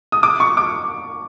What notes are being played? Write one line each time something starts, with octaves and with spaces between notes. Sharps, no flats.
D#6
D6
C#6
D6